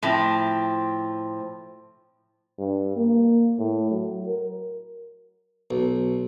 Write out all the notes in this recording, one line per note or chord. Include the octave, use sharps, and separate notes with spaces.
A2 F3 C4
G2
A#3
A2
F#3
A#4
B1